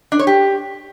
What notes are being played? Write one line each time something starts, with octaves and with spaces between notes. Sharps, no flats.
D4
C#5
G4